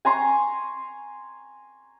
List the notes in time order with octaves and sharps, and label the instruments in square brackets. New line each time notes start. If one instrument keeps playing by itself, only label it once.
[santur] G#5 A#5 C6 C#6